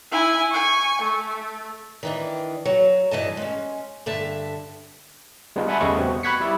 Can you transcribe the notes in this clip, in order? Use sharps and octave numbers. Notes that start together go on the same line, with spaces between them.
E4 G#5
G#5 C#6
A3
D#3 E3 D4
F#3
G2 E3 D#5 A5
G#3 C#4
G2 D3 E5 A5
G3 G#3 B3 D4 F4
E5 F#5 G#5 A5 B5 C6
E2 C#3 G3 A3 D#5 C#6
B3 C4 F#4
B5 C#6 F#6 G#6 B6 C#7
G3 E4 D5 E6